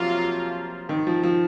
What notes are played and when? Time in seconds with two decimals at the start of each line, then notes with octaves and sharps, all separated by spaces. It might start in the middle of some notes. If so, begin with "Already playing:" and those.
Already playing: C3 F3 F#3 A#3 F4
0.89 D#3
1.07 F3
1.23 F3